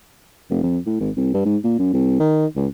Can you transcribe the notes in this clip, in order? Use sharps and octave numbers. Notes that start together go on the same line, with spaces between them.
F1
F2
A2
G#1
C2
G2
G#2
A#2
F#2
C2
D#3
C#2